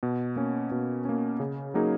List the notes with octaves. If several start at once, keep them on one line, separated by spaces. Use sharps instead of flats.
B2
A#3 C#4
B2
A#3 C#4
C#3
F#3 A#3 D#4 G#4